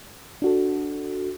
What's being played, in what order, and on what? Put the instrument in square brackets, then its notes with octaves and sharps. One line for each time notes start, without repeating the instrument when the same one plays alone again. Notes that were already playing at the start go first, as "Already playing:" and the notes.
[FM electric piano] D4 F#4 A4